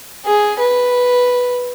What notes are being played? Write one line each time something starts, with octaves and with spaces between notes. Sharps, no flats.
G#4
B4